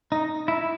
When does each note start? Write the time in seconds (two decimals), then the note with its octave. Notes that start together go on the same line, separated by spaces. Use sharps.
0.12 D#4
0.48 E4